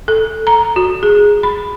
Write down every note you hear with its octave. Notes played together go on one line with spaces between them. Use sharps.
A4
A#5
F#4
G#4
B5